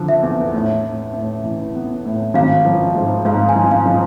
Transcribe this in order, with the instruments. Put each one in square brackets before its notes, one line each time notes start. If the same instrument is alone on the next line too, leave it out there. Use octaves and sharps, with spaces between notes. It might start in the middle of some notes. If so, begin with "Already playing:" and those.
Already playing: [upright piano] D3 F3
[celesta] E5
[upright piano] E2
A2
A2
A2
E3
B3
A2
[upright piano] G#1 [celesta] F5
[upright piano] F3
G#2
[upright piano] G#2 [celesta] F5
[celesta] G#5
[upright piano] F3
[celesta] F5
[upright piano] F3